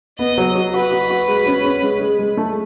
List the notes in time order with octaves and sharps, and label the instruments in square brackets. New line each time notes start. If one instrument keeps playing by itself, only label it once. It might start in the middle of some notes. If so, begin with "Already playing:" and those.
[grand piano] B3 [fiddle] D#5
[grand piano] F#3
F#3
[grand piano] F#4 [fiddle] B4
[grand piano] F#4
F#4
G#3
C#4
C#4
G#3
G#3
G#3
A3